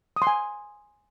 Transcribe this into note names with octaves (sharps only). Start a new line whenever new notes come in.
D#6
C6
G#5